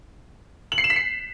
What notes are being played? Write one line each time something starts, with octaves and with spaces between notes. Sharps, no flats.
F#7
C7
E7
B6
C7